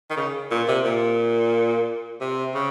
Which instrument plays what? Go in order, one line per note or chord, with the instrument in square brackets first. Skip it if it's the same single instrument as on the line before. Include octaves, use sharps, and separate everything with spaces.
[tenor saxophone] D#3
C#3
A#2
C3
A#2
C3
C#3